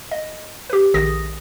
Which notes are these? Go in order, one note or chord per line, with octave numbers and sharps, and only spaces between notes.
D#5
G4 B4
A#1 D#3 G#4 D#6 A#6